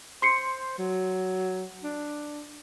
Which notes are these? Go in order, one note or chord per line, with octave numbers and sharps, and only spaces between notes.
C5 C6 C7 C#7
F#3
D4